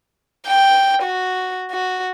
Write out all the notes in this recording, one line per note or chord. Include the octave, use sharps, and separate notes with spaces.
G5
F#4
F#4